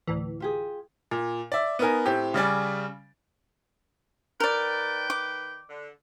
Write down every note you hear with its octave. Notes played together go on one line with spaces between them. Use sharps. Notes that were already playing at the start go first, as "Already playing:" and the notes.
D2 A2 E3
F4 G4 G#4
A#2
D5 E5
B3 D#4 A#4 G#5
A2 C4 G4
C#3 G3 D5 G#5
D#3 A#4 B4 D5 G5
D6
D3